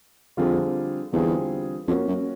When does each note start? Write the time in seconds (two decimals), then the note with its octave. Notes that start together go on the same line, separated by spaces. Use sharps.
0.37 F2 D3 G3 C4 F4 G#4
1.12 E2 D3 G3 C4 F4 G#4
1.87 F2 A#3 C#4 F#4 A#4
2.07 F#2